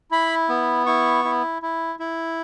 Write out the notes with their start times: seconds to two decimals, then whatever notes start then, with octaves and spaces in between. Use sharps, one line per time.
0.11 E4 B5
0.49 B3
0.86 E4 C#6
1.25 E4
1.62 E4
1.99 E4